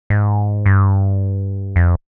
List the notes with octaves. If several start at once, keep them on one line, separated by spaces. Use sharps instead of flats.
G#2
G2
F2